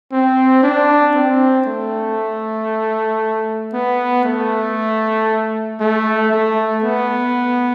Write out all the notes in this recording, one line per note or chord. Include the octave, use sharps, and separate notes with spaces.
C4
D4
C4
A3
B3
A3
A3
A3
B3